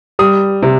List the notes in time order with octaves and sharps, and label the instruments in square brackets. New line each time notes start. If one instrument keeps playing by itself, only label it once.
[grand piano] G3 D#6
C3